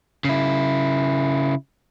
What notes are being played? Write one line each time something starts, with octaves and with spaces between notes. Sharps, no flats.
C#3 E4